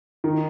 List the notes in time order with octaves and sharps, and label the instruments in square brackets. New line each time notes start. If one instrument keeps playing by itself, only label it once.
[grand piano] D#3